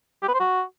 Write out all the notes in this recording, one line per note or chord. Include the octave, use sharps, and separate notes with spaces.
G4
B4
C5
F#4